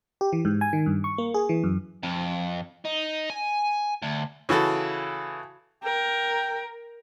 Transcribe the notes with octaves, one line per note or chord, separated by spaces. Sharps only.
G4
E3
G#2
G#5
D#3
G2
C#6
A#3
G#4
E3
F#2
F2
D#4
G#5
D2
C#3 E3 F#4 A4
A#4 G5